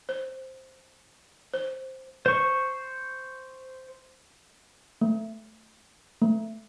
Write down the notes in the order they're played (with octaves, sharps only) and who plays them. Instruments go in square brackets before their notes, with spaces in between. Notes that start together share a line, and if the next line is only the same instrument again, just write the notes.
[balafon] C5
C5
[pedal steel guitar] C5 C#6
[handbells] A3
A3